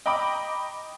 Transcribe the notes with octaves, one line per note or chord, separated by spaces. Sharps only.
D#5 G5 A#5 B5 D6 D#6